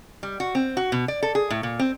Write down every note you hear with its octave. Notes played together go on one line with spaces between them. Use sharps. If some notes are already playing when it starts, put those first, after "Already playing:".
G3
F#4
C4
F#4
B2
D5
A4
G#4
A2
A#2
C4